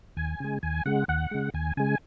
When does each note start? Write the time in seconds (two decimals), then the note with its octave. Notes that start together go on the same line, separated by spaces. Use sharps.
0.17 D#2 G#5
0.40 C#3 G#3
0.63 D#2 G#5
0.86 C#3 G#3 F#5
1.08 D#2 F#5
1.31 C#3 G#3
1.54 D#2 G#5
1.77 C#3 G#3 G#5